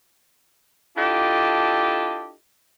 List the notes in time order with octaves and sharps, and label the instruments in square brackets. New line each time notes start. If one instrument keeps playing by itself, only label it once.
[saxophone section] D4 E4 F4 G4 A4 D#5